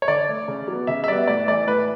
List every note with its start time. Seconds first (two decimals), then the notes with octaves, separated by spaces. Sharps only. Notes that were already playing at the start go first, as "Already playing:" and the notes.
0.02 C#5
0.08 D3 D5
0.29 A3
0.48 C#3
0.68 F#3 B3
0.87 C#3 E5
1.04 E5
1.07 G3 B3 D5
1.27 A2 D5
1.47 E3 A3 D5
1.67 A2 B4